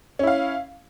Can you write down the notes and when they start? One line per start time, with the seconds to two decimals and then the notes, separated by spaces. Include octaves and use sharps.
0.19 C#4
0.23 E4
0.27 F5